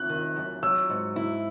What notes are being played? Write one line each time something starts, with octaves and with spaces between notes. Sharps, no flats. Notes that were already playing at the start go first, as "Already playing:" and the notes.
Already playing: F#6
D#3
F#2
F#3 E6
G#2
E4